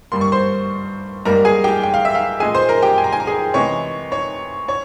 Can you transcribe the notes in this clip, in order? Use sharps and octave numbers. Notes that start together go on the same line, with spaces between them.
G2 G3 A#3 C6
C#6
C5 C6
G#2 G3 A#3 A#4 A#5
G#4 G#5
G4 G5
G5
F5
E5
F5
A#2 G#3 G#4 G#5
C5 C6
A#4 A#5
G4 G5
G#5
A#5
G#5
A#5
G#4 G#5
C3 E3 G#3 C#5 C#6
C#5 C#6
C#5 C#6